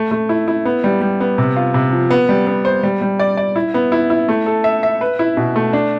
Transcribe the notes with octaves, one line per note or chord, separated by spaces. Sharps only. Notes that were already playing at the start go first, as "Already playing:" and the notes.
Already playing: A3
A3
E4
E4
B3
G3
G3
B3
C3
F4
C3
F3
B3
G3
B3
C5
G3
G3
D5
D5
E4
B3
E4
E4
A3
A4
E5
E5
B4
E4
B2
A3
D4